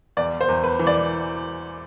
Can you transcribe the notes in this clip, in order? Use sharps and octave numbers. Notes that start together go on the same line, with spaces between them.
E2 D5
C5
E2
B4
E3
D5